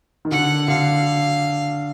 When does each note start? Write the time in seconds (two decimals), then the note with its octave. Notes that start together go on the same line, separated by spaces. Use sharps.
0.25 D#3
0.31 D3 F#5
0.68 D3 F5